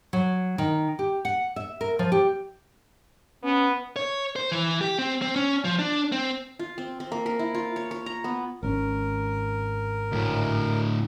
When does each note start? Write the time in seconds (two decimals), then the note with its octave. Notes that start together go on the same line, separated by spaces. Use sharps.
0.13 F#3
0.58 D#3
0.99 G4
1.25 F#5
1.56 E5
1.81 A#4
1.99 F3
2.12 G4
3.44 B3 C#4
3.96 C#5
4.36 C5
4.52 E3
4.81 G4
4.99 C4
5.22 C4
5.36 C#4
5.64 F3
5.79 D4
6.12 C4
6.59 F4
6.78 C4
7.00 C4
7.12 A#3
7.26 A#4
7.39 E4
7.54 F4
7.76 C#5
7.91 C#5
8.06 A#5
8.24 B3
8.63 G#1 C4 C#4 A#4
10.12 D2 A2